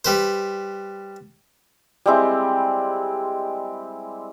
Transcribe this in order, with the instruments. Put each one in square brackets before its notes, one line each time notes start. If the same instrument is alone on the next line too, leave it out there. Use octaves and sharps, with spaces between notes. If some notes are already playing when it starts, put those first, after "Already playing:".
[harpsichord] G3 B4 C5
[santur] G3 G#3 C4 E4